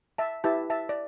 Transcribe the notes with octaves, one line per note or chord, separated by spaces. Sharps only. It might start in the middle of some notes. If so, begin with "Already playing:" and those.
E5 A5
E4 G4 B4 E5 A5
E5 A5
D5